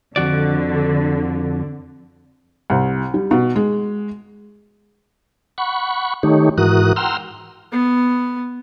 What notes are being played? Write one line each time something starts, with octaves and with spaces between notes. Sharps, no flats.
F2 D3 F#4 D5
C2
G3
B2
G#3
F#5 B5 C#6
D#3 A3 D#4 G4 C#5
G#2 E3 F#4 A#4 D#6 F#6
F#5 G5 A#5 C6 E6 F6
B3